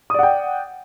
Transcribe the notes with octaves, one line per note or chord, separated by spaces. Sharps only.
D5 F#5 G5 D#6